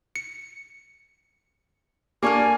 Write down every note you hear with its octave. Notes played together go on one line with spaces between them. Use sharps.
C#7
A#3 D4 G4 A4 G#5 C#6 F6